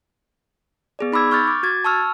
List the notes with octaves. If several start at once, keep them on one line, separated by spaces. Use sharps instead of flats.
B3 G#4 D5
D#4 B5 D6 E6 G#6
C#6 F6 G6 A6
D6
F#4 G#6 A6
A5 C#6 E6 F6